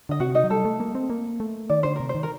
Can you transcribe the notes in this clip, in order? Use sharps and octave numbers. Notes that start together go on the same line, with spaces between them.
D3 D#5
C3 F#4 F#5
D#4 D#5
F#3
G3 A4
A3
A#3
C4
A#3
A3
D#3 D5
D3 C5
C3 A#4
C5
D#3
A#4